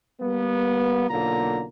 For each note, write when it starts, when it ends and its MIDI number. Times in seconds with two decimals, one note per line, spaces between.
0.21 1.09 55
0.21 1.09 58
0.21 1.09 59
1.10 1.64 35
1.10 1.64 50
1.10 1.64 58
1.10 1.64 65
1.10 1.64 82